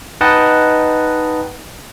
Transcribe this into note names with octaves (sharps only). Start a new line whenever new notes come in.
D#4 B4 D#5 F#5 G5 A5